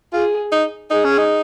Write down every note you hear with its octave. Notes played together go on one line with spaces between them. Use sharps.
F4 G#4
D#4
D#4 G#4
C#4
D#4